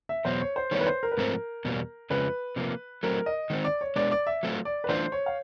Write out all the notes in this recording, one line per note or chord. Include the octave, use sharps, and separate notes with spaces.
E5
E2 B2 F#3 C5
C#5
C5
D#3 G3 B3 E4 C#5
B4
C5
A#4
B4
G#2 F3 A3 C4 A#4
E2 B2 G3 A#3
F2 C#3 F3 G#3 B4
C3 F3 A#3
F#3 A3 C4 A#4
D#5
D#3 G#3 C4
D5
C#5
G#3 B3 D4 D5
D5
E5
F#3 A3 C4 F4
D5
B4
E3 A3 D4 F4 C5
C#5
F5